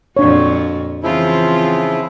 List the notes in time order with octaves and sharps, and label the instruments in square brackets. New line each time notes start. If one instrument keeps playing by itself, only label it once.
[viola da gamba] F2 A#2 F#4 [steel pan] D4 C#5
[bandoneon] C#3 F3 E4 [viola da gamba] E3 C4 F4